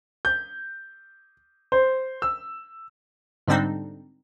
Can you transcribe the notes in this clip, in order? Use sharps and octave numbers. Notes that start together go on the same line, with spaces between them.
G6
C5
E6
G#2 D3 G3 C4 D4 D#4